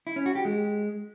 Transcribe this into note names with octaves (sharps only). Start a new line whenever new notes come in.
E4
C#4
F#4
G4
G#3